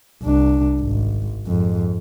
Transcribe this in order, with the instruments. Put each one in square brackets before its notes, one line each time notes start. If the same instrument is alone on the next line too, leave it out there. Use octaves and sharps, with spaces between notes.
[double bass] C2 D4
G#1
F2 G#2